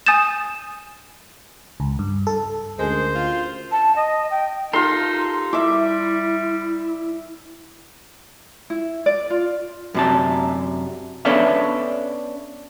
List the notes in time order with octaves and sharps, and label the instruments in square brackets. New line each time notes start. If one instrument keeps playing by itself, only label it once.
[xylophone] G#5 D#6 G6 A6 E7
[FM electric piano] C#2
G2
A4
[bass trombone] D2 [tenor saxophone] G#3 [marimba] C#4 A#4 G#5 [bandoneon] C5
[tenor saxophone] F4
[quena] A5
D#5
G5
[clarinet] D#4 [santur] F4 C6 [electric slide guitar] G4 A4 A#4
[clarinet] G3 [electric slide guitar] E4 [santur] E5 D6
[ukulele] E4
D5
F4
[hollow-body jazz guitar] F#2 C3 A5
B3 C#4 D4 A4 E5 F5